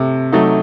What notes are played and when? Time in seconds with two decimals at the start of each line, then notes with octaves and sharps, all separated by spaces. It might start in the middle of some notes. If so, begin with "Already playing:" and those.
Already playing: C3 A3
0.32 F#3 A3 D#4